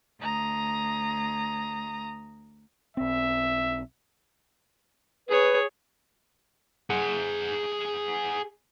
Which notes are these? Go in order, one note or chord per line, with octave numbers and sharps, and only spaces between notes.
D2 A#5 D#6
B1 C4 E5
G#4 B4 C#5
G#4 F#5